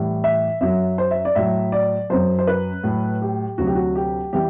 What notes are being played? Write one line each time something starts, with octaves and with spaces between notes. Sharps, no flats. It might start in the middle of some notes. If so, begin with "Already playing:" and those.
Already playing: A2 E3 G3
E5
F#2 F#3 E5
C5
E5
D5
A2 F#3 E5
D5
F#2 F#3 C5
C5
B4
A2 F#3
G4
D2 C3 F#3 F#4
G4
F#4
G4
E3 G3 G4